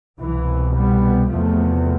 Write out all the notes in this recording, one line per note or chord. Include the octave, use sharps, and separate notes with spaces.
C2 B2 E3
G3 B3
E2 C3 F3 A3